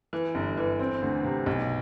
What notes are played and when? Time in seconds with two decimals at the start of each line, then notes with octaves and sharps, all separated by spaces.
0.13 E3
0.35 G1
0.57 E3
0.79 C4
1.02 D2
1.24 C3
1.46 B1